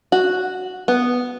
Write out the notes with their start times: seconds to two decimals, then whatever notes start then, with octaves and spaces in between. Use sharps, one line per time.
0.12 F#4
0.88 B3